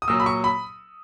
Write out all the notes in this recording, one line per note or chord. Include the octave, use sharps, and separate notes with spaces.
D#6
A#2 F#3 E6
B5
C#6
B5